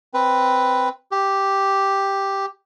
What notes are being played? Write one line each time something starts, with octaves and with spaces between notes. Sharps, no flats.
C4 B4
G4